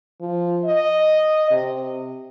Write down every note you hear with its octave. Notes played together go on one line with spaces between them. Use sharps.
F3
D#5
C3